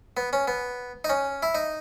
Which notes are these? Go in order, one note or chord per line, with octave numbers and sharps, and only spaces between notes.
B3
C#4
B3
D#4
C#4
E4
D#4